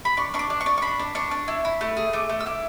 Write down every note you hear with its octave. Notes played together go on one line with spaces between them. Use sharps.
B5
D4 C#6
D4 C#6
D6
D4
C#6
D4
C#6
D4 B5
D4
D4 C#6
D4
E4
E4
A3
G#4
A3 D6
A3
E6
E4 D6